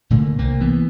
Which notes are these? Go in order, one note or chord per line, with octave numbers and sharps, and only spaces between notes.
A#2 D3 A3 A#3
C2 A#3
E3 B3